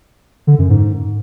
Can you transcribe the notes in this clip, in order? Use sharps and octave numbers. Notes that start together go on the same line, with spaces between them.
D3
F#2
G#2